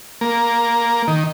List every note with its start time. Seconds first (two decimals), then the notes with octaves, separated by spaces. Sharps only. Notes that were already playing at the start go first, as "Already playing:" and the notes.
0.21 A#3
1.08 D#3